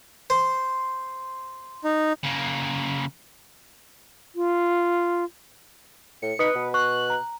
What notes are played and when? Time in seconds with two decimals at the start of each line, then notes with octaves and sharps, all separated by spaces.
0.30 C5
1.85 D#4
2.23 C#3 A#3
4.35 F4
6.22 A2 C#7
6.39 D#4 B4 D#6 C#7
6.55 B2
6.74 C#6 F#6
7.10 A#5